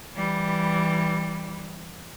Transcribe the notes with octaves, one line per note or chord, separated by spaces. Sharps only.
E3 G3